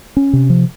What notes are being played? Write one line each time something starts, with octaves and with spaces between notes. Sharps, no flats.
C#4
C3
F3